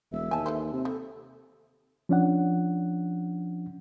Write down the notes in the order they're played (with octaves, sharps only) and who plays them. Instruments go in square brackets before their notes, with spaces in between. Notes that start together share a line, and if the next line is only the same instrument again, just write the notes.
[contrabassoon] E1 [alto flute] E5
[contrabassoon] D#2 [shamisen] G#5 A5
[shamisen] A4 B4 C5
[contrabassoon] C3
[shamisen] G3 [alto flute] A4
[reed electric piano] F3 C#4 D4 F#5